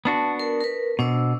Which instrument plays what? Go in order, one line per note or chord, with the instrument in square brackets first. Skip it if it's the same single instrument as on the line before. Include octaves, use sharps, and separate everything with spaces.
[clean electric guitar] B3 D4 F#4 [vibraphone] A5
[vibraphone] A#4
A#4 B4
[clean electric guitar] B2 [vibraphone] D4 C5 E6